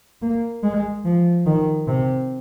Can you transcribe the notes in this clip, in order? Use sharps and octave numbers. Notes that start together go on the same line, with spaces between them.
A#3
G#3
F3
D#3
C3